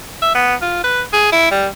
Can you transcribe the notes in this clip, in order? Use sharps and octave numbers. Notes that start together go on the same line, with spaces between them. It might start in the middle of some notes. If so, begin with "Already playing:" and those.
E5
B3
F4
B4
G#4
E4
G3